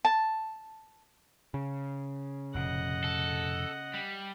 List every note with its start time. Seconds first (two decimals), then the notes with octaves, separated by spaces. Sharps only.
0.05 A5
1.54 C#3
2.54 F1 A#2 D#5 F#5
3.04 A4
3.94 G3